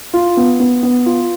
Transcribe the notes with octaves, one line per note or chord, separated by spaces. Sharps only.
F4
B3
B3
B3
F4